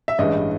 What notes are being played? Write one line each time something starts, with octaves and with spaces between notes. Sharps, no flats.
E5
A1 G2 E3 G#3 D#5